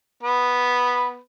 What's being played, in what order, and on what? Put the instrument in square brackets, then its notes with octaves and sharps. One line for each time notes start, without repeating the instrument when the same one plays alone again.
[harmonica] B3 B4